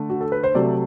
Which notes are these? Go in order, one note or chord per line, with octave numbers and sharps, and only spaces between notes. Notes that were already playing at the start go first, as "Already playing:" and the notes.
Already playing: D3 A3
F#4
A4
B4
C5
C3 F#3 A3 D5